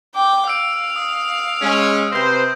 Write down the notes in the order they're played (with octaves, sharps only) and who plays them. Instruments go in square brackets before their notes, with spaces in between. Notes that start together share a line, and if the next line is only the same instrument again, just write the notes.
[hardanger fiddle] G5 D6
[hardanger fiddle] F5 [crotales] E6 D7
[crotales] D#6
[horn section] G#3 C#4
[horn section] C3 B4 C5 [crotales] G6 A#6